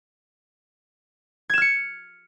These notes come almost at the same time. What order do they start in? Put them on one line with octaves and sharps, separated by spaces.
G#6 E7 F6 C#7